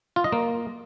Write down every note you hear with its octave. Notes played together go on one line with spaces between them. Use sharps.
F4
D#5
A#3